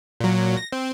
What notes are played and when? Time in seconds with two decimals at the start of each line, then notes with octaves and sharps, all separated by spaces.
0.20 A#2 F#3
0.57 A#6
0.72 C4